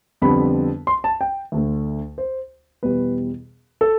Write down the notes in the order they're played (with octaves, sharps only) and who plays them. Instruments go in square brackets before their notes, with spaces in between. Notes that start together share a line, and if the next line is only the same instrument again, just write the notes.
[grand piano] F2 D3 G3 B3 D4 B5
C6
A5
G5
D2 D3 A3
C5
E2 B2 G3 B4
A4